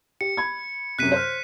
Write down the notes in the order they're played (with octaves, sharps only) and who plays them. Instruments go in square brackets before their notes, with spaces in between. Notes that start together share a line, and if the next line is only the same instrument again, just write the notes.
[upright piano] G4 [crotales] C#7
[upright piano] B5 G#6
[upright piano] F#2 C3 [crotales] F#6 B6 D#7
[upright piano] C5 F6